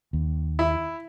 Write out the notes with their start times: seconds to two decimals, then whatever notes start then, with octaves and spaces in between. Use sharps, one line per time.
0.13 D#2
0.59 E4